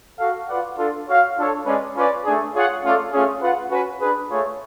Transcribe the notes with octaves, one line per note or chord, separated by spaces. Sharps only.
F#4 A4 F5
F4 B4 D5 F#5
D4 F4 A4
F#4 C#5 F5
D4 F4 A4 C#5
G#3 C#4 G#4 B4 D5
C#4 F4 B4 D5
A3 D4 G#4
F4 G#4 C#5 F#5
A3 C#4 F4 A4 D5
A3 C#4 F4 G#4
F4 B4 F#5
C#4 F#4 B4
D4 G#4 B4
A3 F4 G#4 C#5